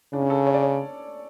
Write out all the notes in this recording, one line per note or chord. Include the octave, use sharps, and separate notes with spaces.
C#3 D4
C#4
A4
C#5
D5
C#5